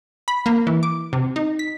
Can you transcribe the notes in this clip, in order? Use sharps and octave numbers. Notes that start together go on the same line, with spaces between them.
B5
A#3
E3
D6
C3
D#4
B6